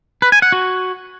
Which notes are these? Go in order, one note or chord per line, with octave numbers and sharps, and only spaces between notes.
B4
G#5
F#5
F#4